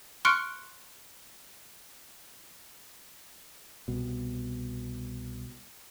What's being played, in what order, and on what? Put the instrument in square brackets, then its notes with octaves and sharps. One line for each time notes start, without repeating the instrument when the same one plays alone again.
[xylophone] C6 C#6 F6 F#6 C#7 D7
[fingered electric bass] C2 B2